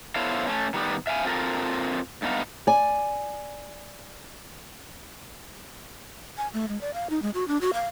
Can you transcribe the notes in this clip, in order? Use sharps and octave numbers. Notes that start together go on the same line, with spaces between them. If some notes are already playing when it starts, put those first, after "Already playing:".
B3 E4 A4 C5 C#5 F5
A3 C#4
D#3 G3 B3
E5 F5 G5 G#5
C4 F4 A4 A#4
G2 A3 B3 D#4 F5
D5 G#5
G#5
A3
G#3
D5
F5
D#4
G#3
F#4
D4
F#4
F5